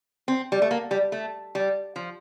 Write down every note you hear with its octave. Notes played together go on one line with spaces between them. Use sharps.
C4
G3
A3
A#3
G3
A3
G3
F3